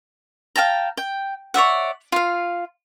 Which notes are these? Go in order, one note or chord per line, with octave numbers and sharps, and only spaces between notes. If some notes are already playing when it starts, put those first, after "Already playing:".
F5 G5 A5 A#5
G5
C#5 D5 E5 F#5
F4 F5